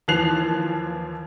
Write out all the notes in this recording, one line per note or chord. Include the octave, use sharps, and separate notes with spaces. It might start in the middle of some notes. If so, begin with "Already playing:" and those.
D#2 E3 F3 F#6 C7 F7